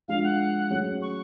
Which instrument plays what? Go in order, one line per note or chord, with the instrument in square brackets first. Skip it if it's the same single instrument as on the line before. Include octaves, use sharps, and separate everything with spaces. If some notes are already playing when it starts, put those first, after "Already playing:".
[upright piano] F3 G#3 D4 [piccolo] F5
[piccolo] F#5
[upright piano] F#3 A3 C#4 G#4
[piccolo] C#6